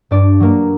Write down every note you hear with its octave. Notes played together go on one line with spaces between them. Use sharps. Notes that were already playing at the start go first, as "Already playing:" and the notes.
G2 D4 D5
F#3 A#3